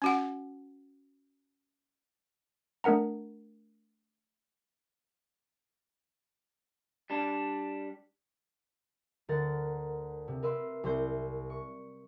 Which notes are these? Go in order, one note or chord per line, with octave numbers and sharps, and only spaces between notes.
C#4 F#4 F#5
A3 D4 A#4 F#5 A#5
G3 D4
D2 D3 A#4 F#5 A#5 A6
C3
A#4 B4 E5 C6
C2 C5 G6
C#6